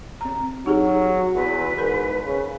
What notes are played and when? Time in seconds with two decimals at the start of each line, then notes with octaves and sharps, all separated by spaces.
0.21 C4 A#5
0.66 F#3 D#4 G4 G#4
1.35 E2 B4
1.78 G#2 A#4
2.25 C#3